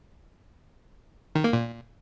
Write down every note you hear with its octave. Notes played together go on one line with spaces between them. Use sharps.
D#3
A#3
A#2